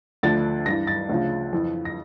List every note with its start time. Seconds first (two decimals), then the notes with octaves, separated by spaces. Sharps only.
0.23 D2 D3 F3 A6
0.66 G2 E3 A#6
0.87 A6
1.09 D2 C#3 F3
1.53 F2 E3
1.85 A#6